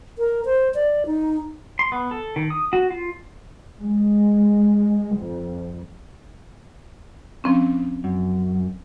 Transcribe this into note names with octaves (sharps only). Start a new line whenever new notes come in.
A#4
C5
D5
D#4
C6
B3
A4
D#3
D#6
F#4
F4
G#3
F2
F3 C4 C#4
F#2